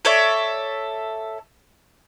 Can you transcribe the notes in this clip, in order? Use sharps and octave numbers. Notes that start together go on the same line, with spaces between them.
A4 C#5 D5 E5